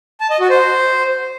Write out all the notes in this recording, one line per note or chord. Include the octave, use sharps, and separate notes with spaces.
A5
D#5
F#4
C5